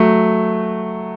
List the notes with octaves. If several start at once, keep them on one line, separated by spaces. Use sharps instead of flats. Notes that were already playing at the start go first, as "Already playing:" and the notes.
Already playing: F#3 A3